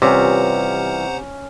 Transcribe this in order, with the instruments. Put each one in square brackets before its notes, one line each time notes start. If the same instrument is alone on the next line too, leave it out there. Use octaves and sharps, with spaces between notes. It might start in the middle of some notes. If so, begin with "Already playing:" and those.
[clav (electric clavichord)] C3 [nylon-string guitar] E3 G3 F4 [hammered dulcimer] C#4 [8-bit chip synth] C5 F#5 A#5